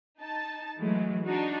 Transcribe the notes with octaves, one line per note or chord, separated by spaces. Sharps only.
D#4 A5
E3 F#3 G#3 A3
D4 D#4 F#4